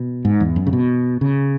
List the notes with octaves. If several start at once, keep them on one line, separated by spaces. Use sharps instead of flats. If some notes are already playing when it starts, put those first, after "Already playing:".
Already playing: B2
G#2
E2
F#2
C#3
B2
C#3